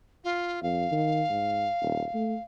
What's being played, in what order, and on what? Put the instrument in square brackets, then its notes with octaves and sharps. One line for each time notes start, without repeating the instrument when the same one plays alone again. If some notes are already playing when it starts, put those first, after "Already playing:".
[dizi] F4
[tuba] F2 [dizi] F5
[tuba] D#3
G#2
D#1
A3